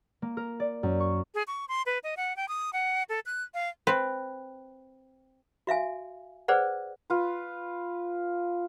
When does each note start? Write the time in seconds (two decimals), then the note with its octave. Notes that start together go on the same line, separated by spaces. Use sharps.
0.22 A#3
0.37 A#4
0.60 D5
0.83 F#2
1.00 C#6
1.35 G#4
1.47 C#6
1.69 C6
1.86 B4
2.04 D#5
2.17 F#5
2.36 G5
2.48 D#6
2.73 F#5
3.09 A4
3.26 F#6
3.54 F5
3.87 C4 B4
5.67 F#4 E5 F5 G#5
6.48 G#4 B4 C5 D5 F#5
7.10 F4 B4